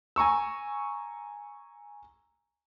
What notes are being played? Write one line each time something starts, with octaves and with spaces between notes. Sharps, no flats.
G#5 A#5 C#6 E6